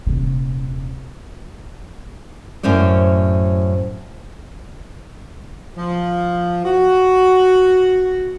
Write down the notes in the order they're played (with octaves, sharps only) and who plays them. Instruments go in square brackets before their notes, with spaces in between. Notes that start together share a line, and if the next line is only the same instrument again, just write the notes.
[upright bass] D#1 C3
[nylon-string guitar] F#2 A2 C#4 C5 D5
[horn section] F3
F#4